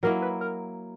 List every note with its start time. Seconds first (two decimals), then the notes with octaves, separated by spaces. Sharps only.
0.03 F#3 A#3 E4 A#4
0.22 B4
0.41 A#4